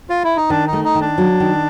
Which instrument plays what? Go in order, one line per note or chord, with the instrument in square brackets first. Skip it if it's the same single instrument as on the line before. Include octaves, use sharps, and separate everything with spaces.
[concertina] F4
E4
D#4
[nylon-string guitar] D#3 [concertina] D4
[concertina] D#4
[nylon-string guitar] A3
[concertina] D#4
[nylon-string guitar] D#3
[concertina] D4
[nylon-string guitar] F#3
D#3